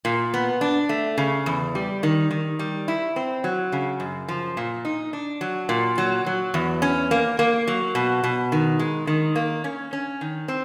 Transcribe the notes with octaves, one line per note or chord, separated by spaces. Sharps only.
A#2
B3
D4
A3
C#3
E2
G3
D#3
D#3
G3
E4
C4
F#3
C#3
F#2
F3
A#2
D#4
D4
F#3
A#2
F#3
F#3
E2
C#4
A#3
A#3
F#3
B2
B2
D#3
G#3
D#3
A#3
C#4
C#4
D#3
C4